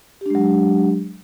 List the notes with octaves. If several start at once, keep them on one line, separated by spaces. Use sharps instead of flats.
F#3 G#3 D4 G4